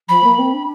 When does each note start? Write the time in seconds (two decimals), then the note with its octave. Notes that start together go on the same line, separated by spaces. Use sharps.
0.08 F3 B5
0.24 A#3
0.38 C4
0.53 D4